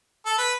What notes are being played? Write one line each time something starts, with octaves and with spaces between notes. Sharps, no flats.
A4
B4